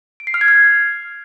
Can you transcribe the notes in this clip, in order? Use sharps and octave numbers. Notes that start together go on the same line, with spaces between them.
D7
C7
F6
G#6
F6